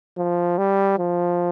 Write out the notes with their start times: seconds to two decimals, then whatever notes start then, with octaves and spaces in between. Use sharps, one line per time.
0.17 F3
0.58 G3
0.98 F3